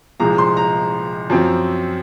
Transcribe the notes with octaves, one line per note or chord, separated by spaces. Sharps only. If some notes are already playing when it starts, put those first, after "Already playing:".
C2 A#2 F3 G#3 A#5
C6
A#5
F#2 F3 C4